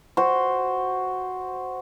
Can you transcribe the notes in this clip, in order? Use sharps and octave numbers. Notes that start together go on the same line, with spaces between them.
F#4 C5